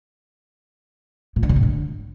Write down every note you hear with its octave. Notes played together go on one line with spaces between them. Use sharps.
A#2
D3
B2
G#2
D3